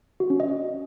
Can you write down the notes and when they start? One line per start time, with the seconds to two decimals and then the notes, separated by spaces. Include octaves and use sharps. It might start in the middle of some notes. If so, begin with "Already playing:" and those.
0.20 F#4
0.30 C#4
0.40 D#5